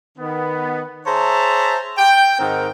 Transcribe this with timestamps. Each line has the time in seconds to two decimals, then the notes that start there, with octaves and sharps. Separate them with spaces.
0.18 D#3 B3
1.06 G#4 C5 C#5 E5 A5 A#5
1.98 G5
2.39 G#2 D#3 C4 A#4 F#5 G5